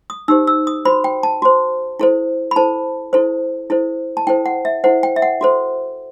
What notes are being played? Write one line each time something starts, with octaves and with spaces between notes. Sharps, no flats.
D#6
D#4 G4 C5 E6
E6
D#6
F#4 C5 B5
G5
A5
F#4 C5
E4 A4 C5
B5
E4 A4 C5 A5
E4 A4 C5
E4 A4 C5
A5
E4 A4 C5 G5
F#5
E5
E4 A4 C5 F#5
G5
E5
F#5
F#4 A4 C5